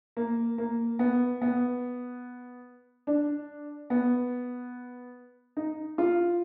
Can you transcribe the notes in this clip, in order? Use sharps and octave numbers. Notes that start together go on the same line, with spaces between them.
A#3
A#3
B3
B3
D4
B3
D#4
F4